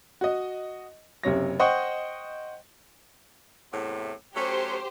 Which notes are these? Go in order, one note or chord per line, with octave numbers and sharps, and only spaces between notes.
F#4 D#5
F#1 C3 C#5 A#6
C5 D#5 F#5 G5 C#6
E2 A2 C3
F#3 A3 C#4 G4 C5